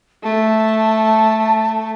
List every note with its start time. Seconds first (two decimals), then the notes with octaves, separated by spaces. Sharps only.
0.23 A3 A5